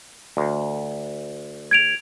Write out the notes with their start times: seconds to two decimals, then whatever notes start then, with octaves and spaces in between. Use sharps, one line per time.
0.37 D2
1.71 G#6 D7 F7